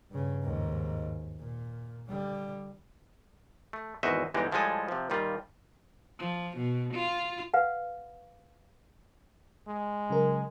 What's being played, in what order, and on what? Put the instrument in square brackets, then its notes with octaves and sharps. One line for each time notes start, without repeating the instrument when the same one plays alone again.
[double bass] G2 C#3
D#2 G#2
A#2
D3 G3
[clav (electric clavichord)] A3
G#1 E2 F#4 C5 D#5 E5
G1 D3 E3 G#3 D#4 G4
A2 F3 G3 G#3 A4 G#5
C3 F3
A#2 D#3 G3 F4
[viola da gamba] F3
B2
F4
[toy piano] B4 F5 F#5
[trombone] G#3
[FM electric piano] C#3 F#3 A#4